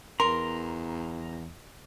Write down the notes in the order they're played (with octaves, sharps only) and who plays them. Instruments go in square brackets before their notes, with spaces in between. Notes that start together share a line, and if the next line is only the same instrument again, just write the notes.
[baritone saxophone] E2 [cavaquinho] A#4 C6 [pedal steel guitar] A#5